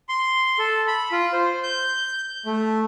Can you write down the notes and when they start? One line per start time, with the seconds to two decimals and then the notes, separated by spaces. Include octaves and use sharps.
0.09 C6
0.59 A4
0.88 B5
1.12 F4
1.33 C5
1.63 G6
2.46 A3